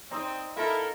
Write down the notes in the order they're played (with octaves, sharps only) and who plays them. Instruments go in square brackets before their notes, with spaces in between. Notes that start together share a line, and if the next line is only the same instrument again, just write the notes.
[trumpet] C4 [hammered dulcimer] D#4 D#5
[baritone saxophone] E4 [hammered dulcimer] F4 [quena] A4 [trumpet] A#4